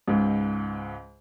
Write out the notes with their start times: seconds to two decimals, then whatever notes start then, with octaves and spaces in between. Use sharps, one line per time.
0.08 C#2 G#2